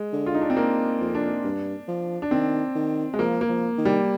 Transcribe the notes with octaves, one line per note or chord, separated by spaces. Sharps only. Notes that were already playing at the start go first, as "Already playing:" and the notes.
Already playing: G#3
D3
F4
D#4
D4
C4
A#3
F2
D4
G2
F3
D4
D#3 C4
D#3
G#3
F3 A#3
A#3
F3
D#3
G3